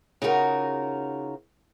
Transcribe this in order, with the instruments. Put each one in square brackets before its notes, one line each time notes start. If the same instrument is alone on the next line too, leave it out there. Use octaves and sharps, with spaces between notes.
[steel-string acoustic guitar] C#3 D#4 F4 F#4 A#4